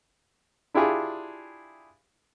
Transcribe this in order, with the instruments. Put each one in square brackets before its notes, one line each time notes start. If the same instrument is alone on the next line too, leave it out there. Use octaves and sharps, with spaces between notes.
[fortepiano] D4 E4 F4 G4 G#4